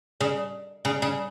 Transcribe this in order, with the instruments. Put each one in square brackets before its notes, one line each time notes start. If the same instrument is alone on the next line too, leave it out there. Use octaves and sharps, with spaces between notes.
[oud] C#3
C#3
C#3